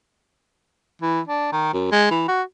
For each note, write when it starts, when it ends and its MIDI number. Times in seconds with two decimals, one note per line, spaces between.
1.02 1.20 52
1.27 1.50 62
1.52 1.73 51
1.73 1.89 42
1.91 2.07 56
2.11 2.26 52
2.28 2.42 66